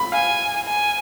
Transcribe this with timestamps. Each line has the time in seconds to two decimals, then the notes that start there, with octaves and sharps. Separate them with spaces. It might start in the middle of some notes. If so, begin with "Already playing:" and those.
Already playing: B5
0.12 F5 G#5
0.68 G#5